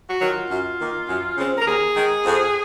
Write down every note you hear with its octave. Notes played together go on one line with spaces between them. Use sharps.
F#4
D#3 F#3
F4
F#2
D#3 A#3
F#2
C#3 G#3 C4
A#4
D#2 G#4
D#3 G#3
F2